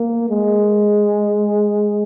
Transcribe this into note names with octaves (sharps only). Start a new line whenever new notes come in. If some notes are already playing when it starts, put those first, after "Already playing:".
Already playing: A#3
G#3